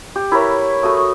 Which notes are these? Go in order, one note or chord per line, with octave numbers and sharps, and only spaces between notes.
G4
E4 A#4 B4 C#5
A3 F#4 D#6